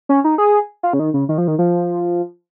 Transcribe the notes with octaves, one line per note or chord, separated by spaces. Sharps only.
C#4
D#4
G#4
F4
C#3
D#3
C#3
D#3
F3
D#3
F3